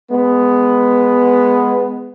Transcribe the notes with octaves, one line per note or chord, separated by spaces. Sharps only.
G#3 B3